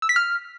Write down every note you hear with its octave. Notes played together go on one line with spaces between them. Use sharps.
E6
B6
F6